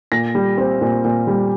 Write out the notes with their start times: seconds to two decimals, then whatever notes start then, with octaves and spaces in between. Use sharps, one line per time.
0.12 A#2 A#6
0.35 G3
0.58 C4
0.81 A#2
1.04 A#2
1.27 G3